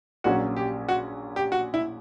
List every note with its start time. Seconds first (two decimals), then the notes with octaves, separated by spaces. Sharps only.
0.24 A#1 A#2 F#3 C#4 F#4
0.57 G4
0.89 F#4
1.36 G4
1.52 F#4
1.74 E4